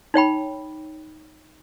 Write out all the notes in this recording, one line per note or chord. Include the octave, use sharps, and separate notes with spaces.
D#4 C#5 G5 B5